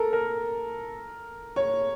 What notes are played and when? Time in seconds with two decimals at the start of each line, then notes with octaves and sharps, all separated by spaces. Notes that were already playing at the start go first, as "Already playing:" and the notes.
Already playing: A4 A#4
0.13 A#4
1.56 C#5